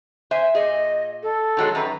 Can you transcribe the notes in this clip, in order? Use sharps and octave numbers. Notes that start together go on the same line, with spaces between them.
C5 E5 G#5
A#2 G#4 D#5
A4
D#3 F#3 G#3
F#2 D#3 B4 A#5